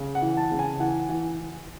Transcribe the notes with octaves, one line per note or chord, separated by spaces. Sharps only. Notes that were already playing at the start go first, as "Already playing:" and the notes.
Already playing: C#3
F#5
E3
A5
C#3
G#5
E3 F#5
E3